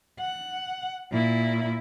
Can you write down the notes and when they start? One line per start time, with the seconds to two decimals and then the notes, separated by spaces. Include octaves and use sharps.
0.19 F#5
1.11 A#2 E4